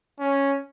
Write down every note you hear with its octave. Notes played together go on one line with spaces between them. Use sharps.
C#4